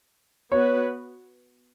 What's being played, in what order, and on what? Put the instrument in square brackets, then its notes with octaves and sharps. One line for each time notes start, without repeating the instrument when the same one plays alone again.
[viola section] B3 F#4 B4 [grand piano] C#5